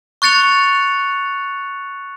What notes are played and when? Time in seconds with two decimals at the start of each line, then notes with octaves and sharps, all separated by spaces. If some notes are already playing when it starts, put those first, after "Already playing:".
0.22 C#6 F#6 A6 C#7 F7